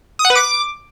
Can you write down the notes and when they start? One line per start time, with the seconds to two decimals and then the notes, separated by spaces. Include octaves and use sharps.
0.19 D#6
0.25 F#5
0.30 B4
0.35 D6